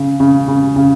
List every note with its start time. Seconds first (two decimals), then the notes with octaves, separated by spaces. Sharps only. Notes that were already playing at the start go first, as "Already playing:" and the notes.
Already playing: C#3
0.20 C#3
0.48 C#3
0.76 C#3